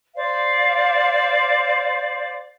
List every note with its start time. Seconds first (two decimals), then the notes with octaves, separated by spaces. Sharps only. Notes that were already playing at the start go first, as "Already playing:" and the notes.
0.16 C5 D5 F5